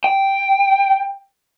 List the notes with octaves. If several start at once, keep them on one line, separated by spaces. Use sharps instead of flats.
G5